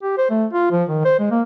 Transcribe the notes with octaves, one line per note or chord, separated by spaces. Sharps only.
G4
C5
A3
F4
F3
D#3
C5
G#3
A#3